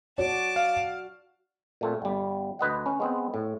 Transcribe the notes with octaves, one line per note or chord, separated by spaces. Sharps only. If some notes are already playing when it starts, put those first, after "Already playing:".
F#4 C#5 D5 A5 D6
F5
A#2 A3 C4
G1 G3
D2 B4 D#5 F#5
C#4
G#3 B3 C4
A2